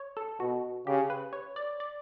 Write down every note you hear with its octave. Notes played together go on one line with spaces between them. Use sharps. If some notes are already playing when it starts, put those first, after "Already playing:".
Already playing: C#5
A4
B2 F#4
C#3 G4
B4
C#5
D5
D5